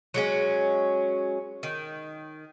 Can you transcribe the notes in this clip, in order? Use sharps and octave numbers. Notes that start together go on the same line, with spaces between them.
F#3 G#3 C#4
D#3